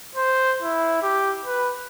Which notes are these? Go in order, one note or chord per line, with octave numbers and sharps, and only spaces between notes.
C5
E4
G4
B4